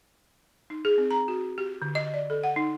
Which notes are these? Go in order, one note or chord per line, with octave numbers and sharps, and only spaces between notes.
D#4
G#4
C4
A#5
F#4
G4
D3
D#5
D5
A4
F#5
D#4